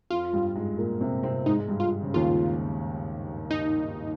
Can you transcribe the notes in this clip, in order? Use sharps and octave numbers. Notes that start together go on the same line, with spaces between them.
F2 F3 F4
G2 G3
G#2 G#3
A#2 A#3
C3 C4
C3 C4
G#2 G#3 D#4
G#3
G2 G3
F4
C#3
D#2 D#3 F4
D#4